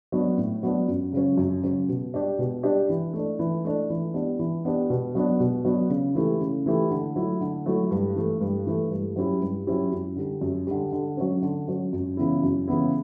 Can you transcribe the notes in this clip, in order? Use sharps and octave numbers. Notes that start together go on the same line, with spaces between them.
F#3 B3 D4
A2
F#3 B3 D4
F#2
C#3 F#3 C#4
F#2
C#3 F#3 C#4
B2
G3 D4 G4
B2
G3 D4 G4
E3
A3 D4
E3
A3 D4
E3
B3 D4 G4
E3
B3 D4 G4
B2
F#3 B3 D4
B2
F#3 B3 D4
C#3
E3 A3 E4 G4
C#3
E3 A3 E4 G4
D3
F#3 A3 E4
D3
F#3 A3 E4
G2
E3 A3
G2
E3 A3
G2
F#3 C#4 E4 G4
G2
F#3 C#4 E4 G4
F#2
D3 G3
F#2
D3 G3
D3
F#3 C#4
D3
F#3 C#4
F#2
C#3 E3 B3 E4
F#2
C#3 E3 B3 E4